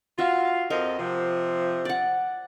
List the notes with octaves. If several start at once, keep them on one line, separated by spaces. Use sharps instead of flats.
F4 F#4 E5 F5
F2 F3 A#4 D#5
C3 F3
D5 F#5